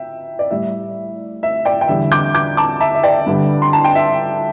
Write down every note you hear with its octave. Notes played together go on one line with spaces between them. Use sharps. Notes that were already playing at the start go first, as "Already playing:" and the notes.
Already playing: E5 G5
D5
A2 G3 E5
E5
D5 G5
G5
E2 D3 G3 E5
D6 G6
D6 G6
A5 D6
E5 A5
E5
D5 G5
G2 D3 G3
C6
A5
G5
E5